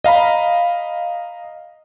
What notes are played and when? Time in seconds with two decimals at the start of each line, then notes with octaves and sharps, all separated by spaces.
0.04 D#5 F5 A#5 B5